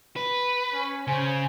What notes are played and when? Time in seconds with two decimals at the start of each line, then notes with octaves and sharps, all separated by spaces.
0.16 B4
0.73 C#4
1.07 C#3 C5 G#5